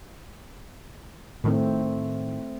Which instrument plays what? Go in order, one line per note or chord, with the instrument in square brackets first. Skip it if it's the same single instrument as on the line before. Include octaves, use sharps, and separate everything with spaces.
[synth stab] A2 D#3 [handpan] A3 C4